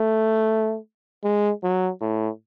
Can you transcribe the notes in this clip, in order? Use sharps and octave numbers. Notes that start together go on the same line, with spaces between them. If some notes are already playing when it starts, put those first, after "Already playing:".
Already playing: A3
G#3
F#3
A2